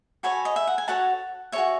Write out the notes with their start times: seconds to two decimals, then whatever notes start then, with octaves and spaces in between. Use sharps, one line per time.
0.23 F#4 A4 C#5 G#5 B5
0.45 D#5
0.56 E5
0.67 F#5
0.78 G#5
0.88 F#4 A4 C#5 F#5 A5
1.52 A4 C#5 E5 G#5
1.58 F#4